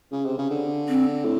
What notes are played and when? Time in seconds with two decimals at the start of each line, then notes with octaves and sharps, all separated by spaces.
0.12 C#3
0.26 C3
0.38 C#3
0.50 D3
0.88 C4
1.25 A2